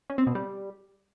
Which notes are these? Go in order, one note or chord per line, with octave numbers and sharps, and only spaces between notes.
C#4
C4
B2
G3